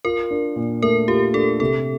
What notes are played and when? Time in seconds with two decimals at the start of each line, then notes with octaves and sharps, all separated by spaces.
0.05 F4 A#4
0.31 D4
0.56 A#2
0.83 A3 A#4
1.08 F4 G4
1.34 D4 A4
1.60 C3 A4